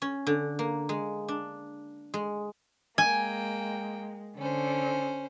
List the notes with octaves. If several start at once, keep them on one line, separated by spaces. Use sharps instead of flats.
C#4
D3
A#3
G#3
D4
G#3
G#3 A#3 G5 G#5
D3 C#4 C5